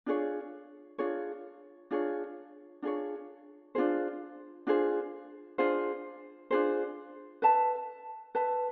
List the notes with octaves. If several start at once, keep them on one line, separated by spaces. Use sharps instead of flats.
D4 F4 G#4 C#5
D4 F4 G#4 C#5
D4 F4 G#4 C#5
D4 F4 G#4 C#5
D4 F4 G#4 C5
D4 F4 G#4 C5
D4 F4 G#4 C5
D4 F4 G#4 C5
B4 E5 A5
B4 E5 A5